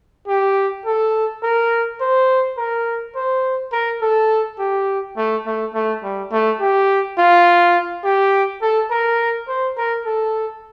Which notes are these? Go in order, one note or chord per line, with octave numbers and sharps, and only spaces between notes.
G4
A4
A#4
C5
A#4
C5
A#4
A4
G4
A3
A3
A3
G3
A3
G4
F4
G4
A4
A#4
C5
A#4
A4